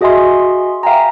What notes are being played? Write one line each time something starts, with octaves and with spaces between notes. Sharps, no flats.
F#4 G#4 D#5 E5 G#5 C6
E5 F5 G5 G#5 A#5